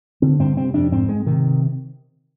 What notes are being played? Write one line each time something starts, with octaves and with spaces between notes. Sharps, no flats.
D3 C4
G2 C4
C3 C4
F2 D4
G#2 C4
G#2 G#3
C3 D#3